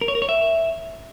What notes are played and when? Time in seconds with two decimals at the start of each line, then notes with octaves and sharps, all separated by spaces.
0.01 A#4
0.08 C#5
0.15 A#4
0.22 C#5
0.29 E5